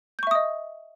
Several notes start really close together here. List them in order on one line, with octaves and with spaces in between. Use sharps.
G6 C#6 E5 D#6 D#5